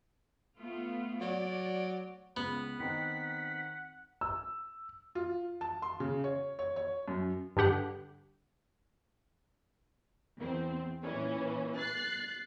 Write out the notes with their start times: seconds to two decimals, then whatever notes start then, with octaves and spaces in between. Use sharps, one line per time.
0.57 A3 B3 F4
1.21 F#3 D5
2.36 C#2 B3 B4
2.80 D#3 C4 D#4 F#5 B6
4.21 E6
5.15 F4
5.61 A5
5.82 C6
6.00 C#3
6.24 C#5
6.59 C#5
6.76 C#5
7.08 F#2
7.57 G2 D3 G4 F#5
10.39 E2 C4
11.03 A#2 E3 C#4
11.76 F#6 A6 C7